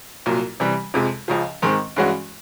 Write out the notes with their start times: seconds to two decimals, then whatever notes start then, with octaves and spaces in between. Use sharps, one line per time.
0.26 C2 A#2 F#3
0.60 C3 E3 G3
0.94 F2 C3 F3 G#3
1.28 C#2 C#3 F3
1.62 G#2 D#3 G#3 C4
1.96 G2 E3 G#3 C#4 F#4